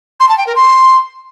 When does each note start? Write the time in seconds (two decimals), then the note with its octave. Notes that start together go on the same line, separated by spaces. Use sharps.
0.20 C6
0.29 A5
0.38 G5
0.47 A#4
0.56 C6